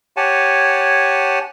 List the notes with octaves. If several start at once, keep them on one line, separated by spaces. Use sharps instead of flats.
G4 C#5 F#5 G#5 A5